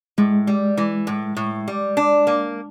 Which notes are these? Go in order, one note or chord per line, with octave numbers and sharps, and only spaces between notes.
A2 G#3
G3
E3
A2
A2
G3
D4
A#3